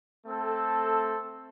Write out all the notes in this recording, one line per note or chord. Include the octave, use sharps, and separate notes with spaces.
A3 C4 A4